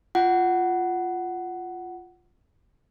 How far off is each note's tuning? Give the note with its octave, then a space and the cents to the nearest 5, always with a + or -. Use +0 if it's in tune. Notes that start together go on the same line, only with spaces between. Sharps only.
F4 +0 F#5 +10